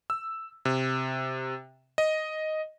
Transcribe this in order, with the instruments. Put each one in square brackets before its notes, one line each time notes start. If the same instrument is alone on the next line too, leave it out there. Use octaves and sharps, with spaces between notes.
[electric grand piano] E6
C3
D#5